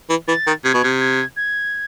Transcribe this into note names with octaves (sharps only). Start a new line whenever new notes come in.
E3
E3 A6
D#3
C3 G#6
B2
C3
G#6
G#6